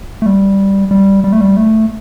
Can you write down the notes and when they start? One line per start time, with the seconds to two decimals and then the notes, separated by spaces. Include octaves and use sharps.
0.22 A3
0.26 G3
0.91 G3
1.24 G3
1.33 A3
1.41 G3
1.57 A3